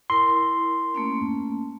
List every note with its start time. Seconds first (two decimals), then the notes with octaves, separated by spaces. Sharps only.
0.10 E4 A#4 C6
0.94 A3 A#3 C#4